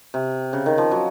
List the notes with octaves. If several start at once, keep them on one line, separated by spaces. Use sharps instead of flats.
C3
C#3
D#3
F3
F#3